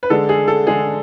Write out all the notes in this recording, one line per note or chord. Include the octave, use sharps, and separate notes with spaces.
B4
D3 G#3 D4 A4
G#4
A4
D3 G#3 D4 G#4